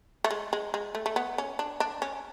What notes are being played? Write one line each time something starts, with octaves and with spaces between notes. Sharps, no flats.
A3
G#3
G#3
G#3
A3
A3
B3
C#4
D4
D4
C#4